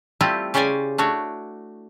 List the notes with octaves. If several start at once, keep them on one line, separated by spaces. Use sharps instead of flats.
G3 A3 C4 E4 F4 G4
C#3 C#4 G4 C5 D5 G#5
A3 D4 F#4 C#5